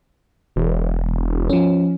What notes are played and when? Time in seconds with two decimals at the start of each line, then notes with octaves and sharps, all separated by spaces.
0.56 E1
1.50 F3 C#4